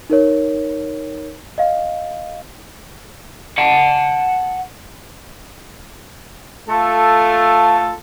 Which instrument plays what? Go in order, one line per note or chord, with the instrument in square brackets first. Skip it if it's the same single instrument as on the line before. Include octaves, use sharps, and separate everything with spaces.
[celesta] D#4 A#4 C#5
D#5 F5
[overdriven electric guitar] F#5 A5
[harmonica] A3 F4 A4